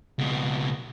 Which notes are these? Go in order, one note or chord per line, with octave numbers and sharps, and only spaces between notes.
C#2 B2